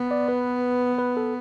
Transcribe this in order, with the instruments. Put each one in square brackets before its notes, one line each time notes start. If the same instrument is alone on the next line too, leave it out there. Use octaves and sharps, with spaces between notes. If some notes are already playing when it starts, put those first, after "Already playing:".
Already playing: [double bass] B3
[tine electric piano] D5
B4
B4
A4